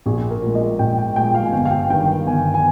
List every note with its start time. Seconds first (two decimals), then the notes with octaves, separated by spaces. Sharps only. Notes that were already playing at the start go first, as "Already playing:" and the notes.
0.06 A#1 G#4
0.30 A#4
0.42 A#2 G#3
0.55 D#5
0.79 A#1 G5
0.98 G5
1.16 A#2 G#3 G5
1.35 F5
1.45 G#5
1.53 G1 G5
1.65 F5
1.71 G5
1.90 G2 G5
1.93 D#3
2.09 F5
2.26 G1 G#5
2.54 G#5